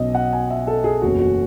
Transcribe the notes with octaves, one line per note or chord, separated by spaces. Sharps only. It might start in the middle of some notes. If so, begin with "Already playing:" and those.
Already playing: B1 B2 F#3 C#4 D#5
F#5
G#5
E5
A4
G#4
F#1 E2 B2 A3 C#4 F#4
F#4